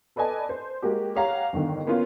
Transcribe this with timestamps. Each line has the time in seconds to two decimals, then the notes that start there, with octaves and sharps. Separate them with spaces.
0.16 A4 B4 D5 D#5 G#5 A5
0.49 C5
0.82 G#3 A#3 F#4 G4
1.16 G4 C#5 F5 F#5 A#5
1.53 G1 D3 D#3
1.87 A#3 B3 C#4 F4